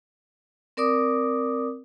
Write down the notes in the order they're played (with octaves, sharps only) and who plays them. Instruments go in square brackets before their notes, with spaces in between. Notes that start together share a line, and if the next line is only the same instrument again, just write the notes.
[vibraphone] C4 A#4 D5 D6 D#6